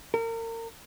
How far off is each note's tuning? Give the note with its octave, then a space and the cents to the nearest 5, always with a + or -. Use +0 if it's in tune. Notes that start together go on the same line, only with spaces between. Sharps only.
A#4 -35